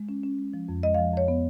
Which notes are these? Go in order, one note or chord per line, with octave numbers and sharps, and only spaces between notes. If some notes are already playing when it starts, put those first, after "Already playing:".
Already playing: G#3
C#4
C#4
G#3
F3
F2
G#3 D#5
F5
F3
F2 C#5
B3